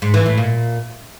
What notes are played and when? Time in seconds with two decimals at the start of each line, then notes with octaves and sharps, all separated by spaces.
0.02 G#2
0.14 E3
0.26 A2
0.38 A#2